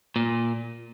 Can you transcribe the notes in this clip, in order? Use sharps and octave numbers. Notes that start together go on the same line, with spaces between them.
A#2